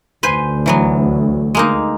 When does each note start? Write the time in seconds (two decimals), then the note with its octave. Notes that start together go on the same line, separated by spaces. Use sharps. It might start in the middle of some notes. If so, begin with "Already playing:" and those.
0.23 D2 B4 C5 G#5
0.66 E3 F#3 B3
1.55 G#3 A#3 D#4